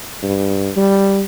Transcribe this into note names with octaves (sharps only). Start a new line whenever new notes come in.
G2
G3